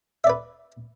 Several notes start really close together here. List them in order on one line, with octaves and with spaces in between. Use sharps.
E5 D5 B4